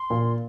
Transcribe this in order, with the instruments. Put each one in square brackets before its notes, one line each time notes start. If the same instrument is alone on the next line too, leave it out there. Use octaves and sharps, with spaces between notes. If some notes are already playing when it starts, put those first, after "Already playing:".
Already playing: [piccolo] C6
[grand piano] A#2